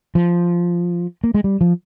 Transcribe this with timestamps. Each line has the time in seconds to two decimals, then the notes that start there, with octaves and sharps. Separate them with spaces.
0.15 F3
1.24 A#3
1.34 G#3
1.44 G3
1.61 F3